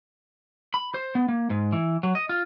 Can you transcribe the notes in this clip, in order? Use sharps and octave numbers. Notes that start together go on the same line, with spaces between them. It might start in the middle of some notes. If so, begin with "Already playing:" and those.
B5
C5
B3
A#3
G#2
E3
F#3
D#5
F4